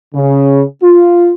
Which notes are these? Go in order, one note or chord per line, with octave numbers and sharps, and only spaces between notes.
C#3
F4